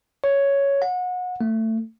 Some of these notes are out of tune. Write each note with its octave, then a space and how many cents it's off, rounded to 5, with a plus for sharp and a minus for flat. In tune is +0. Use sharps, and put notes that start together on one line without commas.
C#5 +5
F#5 -30
A3 +20